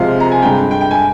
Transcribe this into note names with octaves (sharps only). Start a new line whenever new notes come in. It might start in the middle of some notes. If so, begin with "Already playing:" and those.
Already playing: C3 F3 G#3 F5
A#5
G#5
G2 D3 G#3 G5
G5
G5
G#5